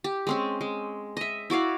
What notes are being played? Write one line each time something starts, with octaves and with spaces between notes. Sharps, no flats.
G4
G#3 C4 C#4
G#3
D#5 E5
E4 F#4 D5 F5